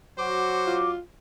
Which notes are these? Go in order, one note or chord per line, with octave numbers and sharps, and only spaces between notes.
F#3 F#4 C5 D6
F4